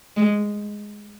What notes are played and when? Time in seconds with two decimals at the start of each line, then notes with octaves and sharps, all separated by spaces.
0.17 G#3